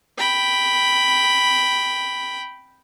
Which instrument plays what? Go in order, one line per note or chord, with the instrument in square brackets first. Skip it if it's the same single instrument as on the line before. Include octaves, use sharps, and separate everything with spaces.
[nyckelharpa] G5 B5